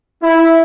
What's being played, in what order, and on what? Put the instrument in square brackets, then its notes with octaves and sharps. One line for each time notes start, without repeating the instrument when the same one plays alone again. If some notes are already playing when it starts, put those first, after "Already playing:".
[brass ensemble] E4